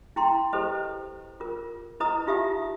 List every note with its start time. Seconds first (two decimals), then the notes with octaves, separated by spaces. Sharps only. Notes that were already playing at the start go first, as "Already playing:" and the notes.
0.16 E4 G5 A#5 C6
0.53 G4 A4 B4 C5 D#5
1.40 F4 A#4
2.00 E4 B4 D#5 A#5 D#6
2.26 D#4 F4 G4 E5 F5 D#6